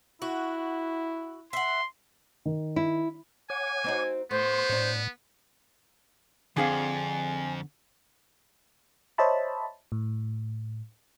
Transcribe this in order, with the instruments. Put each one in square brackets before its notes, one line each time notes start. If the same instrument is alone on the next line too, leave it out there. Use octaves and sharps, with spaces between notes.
[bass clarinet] E4 [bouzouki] F#4
[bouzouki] E5 F#5 [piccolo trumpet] C6
[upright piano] D#3
[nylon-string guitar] E4
[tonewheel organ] C#5 F#5 D6 [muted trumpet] G#5
[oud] C4 D#4 F#4
[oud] A2 [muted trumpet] B3 [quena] C5 [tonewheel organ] C6 C#6
[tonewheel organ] A2 [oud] D4 C#5
[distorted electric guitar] F2 [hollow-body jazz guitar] D3 C4 [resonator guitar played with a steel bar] D4 G#4 F5 [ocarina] G#5
[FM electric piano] C5 C#5 D#5 E5 A5 B5
A2